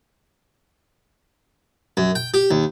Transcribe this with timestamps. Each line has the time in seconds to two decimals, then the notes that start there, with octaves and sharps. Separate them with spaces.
1.97 F#2
2.15 G5
2.34 G4
2.51 D#2